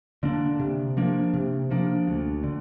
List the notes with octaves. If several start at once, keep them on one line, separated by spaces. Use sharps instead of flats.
D3 A#3 D4
C3
F3 A#3 D4
C3
F3 A#3 D4
D2
D3